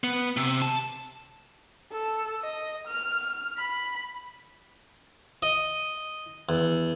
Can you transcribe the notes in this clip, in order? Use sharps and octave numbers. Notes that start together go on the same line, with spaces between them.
B3
C3
A5
A4
D#5
F6
B5
D#5
E2